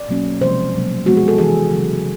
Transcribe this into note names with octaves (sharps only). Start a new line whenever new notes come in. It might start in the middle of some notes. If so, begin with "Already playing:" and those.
Already playing: D5
B2 F#3 A#3 C#4
C3 F3 G#3 C5
B2 F#3 A#3
F3 G#3 B3 F#4
G#4
A4
C3 E3 G#3 G#4
C#3 F#3 B3